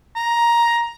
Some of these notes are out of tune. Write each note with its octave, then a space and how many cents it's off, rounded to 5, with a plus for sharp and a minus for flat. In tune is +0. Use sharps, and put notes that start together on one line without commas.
A#5 +10